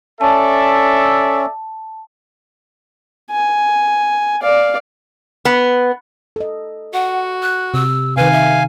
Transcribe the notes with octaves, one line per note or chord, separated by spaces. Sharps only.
C#4 A4 D5 E5 A5
G#5
D5 F5
B3
A4 D#5
F#4 F#5
F#6
C3 E6
C3 D#3 B4 F5 G#5
E5